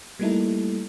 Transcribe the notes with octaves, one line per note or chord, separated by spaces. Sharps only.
G3 A3 A#3 D#4 E4 A4